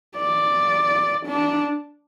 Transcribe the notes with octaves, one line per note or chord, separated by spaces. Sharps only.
D5
D4